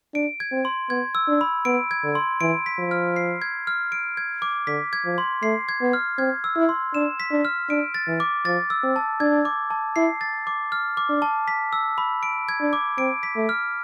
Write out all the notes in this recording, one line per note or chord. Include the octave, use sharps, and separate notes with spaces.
D4 D7
G#6
C4
C6
B3 G#6
E6
D4
B5
B3 D7
G#6
D3
C6
E3 D7
B6
F3
F6
C7
G#6
F6
D7
G#6
D6
D3 B6
G#6
F3
C6
A3 C7
G#6
B3
F6
C4 G#6
E6
E4
C6
D4 E7
B6
D4
F6
D4 D7
A6
E3
D6
F3 A6
E6
C4
A5
D4 G#6
D6
A5
E4 C7
A6
D6
F6
D6
D4
A5
B6
E6
B5
D7
G#6
D4
D6
C4 D7
B6
A3
F6